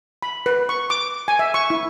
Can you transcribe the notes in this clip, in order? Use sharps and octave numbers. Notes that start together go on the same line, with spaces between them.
B5
B4
C#6
D6
G#5
E5
C#6
E4